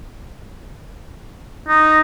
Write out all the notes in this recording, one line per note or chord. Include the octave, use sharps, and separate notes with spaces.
D#4